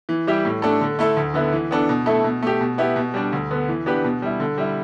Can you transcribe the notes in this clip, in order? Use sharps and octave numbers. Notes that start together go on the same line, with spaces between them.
E3
G3 E4 G4
A2
A3 D4 A4
D3
A3 E4 A4
D2
D3 B3 E4
E3
B3 D4 A4
B2
A3 E4 A4
B2
A3 G4
B2
B3 E4 G4
B2
G3 D4
D2
D3 B3
E3
B3 D4 G4 B4
B2
G3 E4
D3
G3 E4